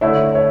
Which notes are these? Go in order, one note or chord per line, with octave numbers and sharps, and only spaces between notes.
D3 A3 E4 C#5 E5
C#5 E5